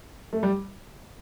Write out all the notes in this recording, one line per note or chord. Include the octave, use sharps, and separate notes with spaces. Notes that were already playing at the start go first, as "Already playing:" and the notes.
A3
G3